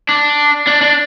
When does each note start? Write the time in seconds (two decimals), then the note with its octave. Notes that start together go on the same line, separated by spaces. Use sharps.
0.09 D4
0.67 D4
0.82 D4